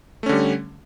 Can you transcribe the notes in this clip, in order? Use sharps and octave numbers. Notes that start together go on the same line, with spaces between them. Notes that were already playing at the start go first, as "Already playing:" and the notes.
D3 G3 A3 C#4